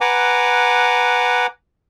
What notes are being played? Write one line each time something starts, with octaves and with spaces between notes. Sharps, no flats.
B4 F#5 G#5 A#5 D6